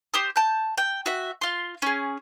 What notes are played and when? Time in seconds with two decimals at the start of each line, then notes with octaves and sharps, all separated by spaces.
0.14 G4 C5 D#6
0.36 A5 G6
0.78 G5
1.06 F#4 E5
1.41 F4 C6
1.82 C#4 G#4